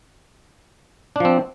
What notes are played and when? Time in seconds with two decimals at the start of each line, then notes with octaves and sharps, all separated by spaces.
1.16 D4
1.20 F3
1.25 C4